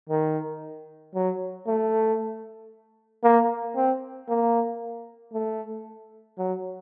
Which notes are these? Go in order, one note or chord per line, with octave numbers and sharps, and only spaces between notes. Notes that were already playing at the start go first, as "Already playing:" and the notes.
D#3
F#3
A3
A#3
C4
A#3
A3
F#3